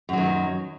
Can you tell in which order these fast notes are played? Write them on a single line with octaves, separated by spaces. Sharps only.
F#2 F#3 D#3